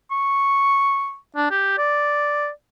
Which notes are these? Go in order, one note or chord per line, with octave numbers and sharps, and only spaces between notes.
C#6
D4
G4
D5